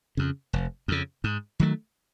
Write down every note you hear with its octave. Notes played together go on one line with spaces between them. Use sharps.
F2 C#3
F1
F2 C#3
G#2
D#3 F#3 A3